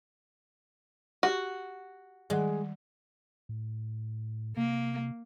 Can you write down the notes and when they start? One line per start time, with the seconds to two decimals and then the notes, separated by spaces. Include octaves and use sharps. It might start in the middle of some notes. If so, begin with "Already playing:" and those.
1.23 F#4 G4
2.30 D#3 G3 G#3
3.49 A2
4.57 C3 A#3